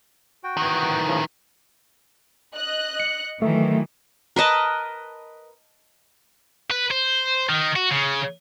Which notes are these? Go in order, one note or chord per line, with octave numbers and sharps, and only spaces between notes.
F#4 G5
D#3 E3
A2 C#3 F3
D#5 F#6
C#7
D#3 E3 F#3 A3
A#4 B4 D#5 A5
B4
C5
D#3
F#4
C#3